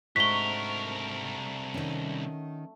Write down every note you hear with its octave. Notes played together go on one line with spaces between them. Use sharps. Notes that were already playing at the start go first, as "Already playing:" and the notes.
C2 G#2 A3 D4 F#4 A#4 B6 G7
D#3 C#4